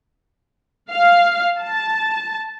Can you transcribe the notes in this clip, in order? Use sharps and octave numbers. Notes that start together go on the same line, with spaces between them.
F5
A5